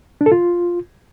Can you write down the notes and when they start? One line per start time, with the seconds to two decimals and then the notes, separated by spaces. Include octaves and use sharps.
0.21 D4
0.26 A4
0.32 F4